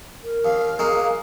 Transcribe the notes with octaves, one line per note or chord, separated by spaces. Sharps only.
A#4
D#2 F5
F#3 G#3 A#3